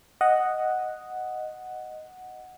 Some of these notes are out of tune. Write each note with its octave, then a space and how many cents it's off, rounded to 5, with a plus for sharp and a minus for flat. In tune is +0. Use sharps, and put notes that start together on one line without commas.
D#5 +0 F#5 +0